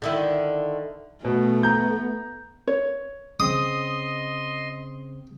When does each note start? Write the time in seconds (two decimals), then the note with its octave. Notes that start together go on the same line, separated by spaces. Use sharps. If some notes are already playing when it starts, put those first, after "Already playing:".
0.02 D3 D#3 E4
1.25 B2 A3 B3
1.63 A#5 G6
2.67 C#5
3.40 C#3 C4 D#5 C6 D#6